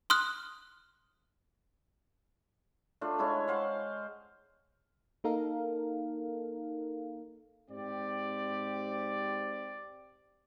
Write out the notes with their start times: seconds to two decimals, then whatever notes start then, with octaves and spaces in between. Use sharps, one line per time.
0.10 C6 D#6 F6 F#6
3.01 A3 D4 F4
3.19 G#3 E4 C#5
3.48 C5 F5 F#5
5.24 A#3 D#4 A4 A#4 F5
7.70 G#2 C4 G4 D5